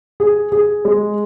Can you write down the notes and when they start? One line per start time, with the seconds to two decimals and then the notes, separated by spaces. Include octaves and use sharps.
0.20 G#4
0.52 G#4
0.85 G#3